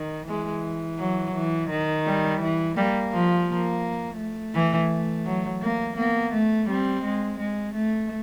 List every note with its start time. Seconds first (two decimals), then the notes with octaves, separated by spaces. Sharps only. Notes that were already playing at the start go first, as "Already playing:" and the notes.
Already playing: D#3
0.28 E3 G#3
0.99 F#3
1.35 E3
1.70 D#3
2.06 G3
2.41 E3
2.77 G3 A#3
3.13 F3
3.49 A#3
4.19 A3
4.55 E3
5.26 F#3
5.62 A#3
5.97 A#3 B3
6.33 A3
6.69 G3 C4
7.04 G#3
7.39 G#3
7.75 A3